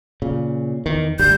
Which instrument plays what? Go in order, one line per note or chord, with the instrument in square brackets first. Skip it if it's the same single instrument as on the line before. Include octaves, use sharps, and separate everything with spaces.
[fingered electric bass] A#2 C#3
E2 D#3
[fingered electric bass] G1 D2 G3 [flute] G6